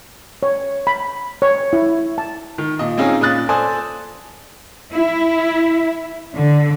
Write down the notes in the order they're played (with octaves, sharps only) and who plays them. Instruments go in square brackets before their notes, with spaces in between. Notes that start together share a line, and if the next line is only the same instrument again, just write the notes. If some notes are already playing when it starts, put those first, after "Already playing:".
[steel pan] C#5
B5
C#5
E4
A5
[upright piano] D#3
A#2 D#5
C4 C#4 D#4 F4 G#4
A#2 C#4 D#6 F#6 A6
A4 C5 D5 G#5 D#6
[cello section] E4
D3